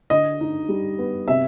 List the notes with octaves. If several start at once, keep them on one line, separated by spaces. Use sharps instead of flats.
D3 D#5
D#4
G3
B3
C3 E5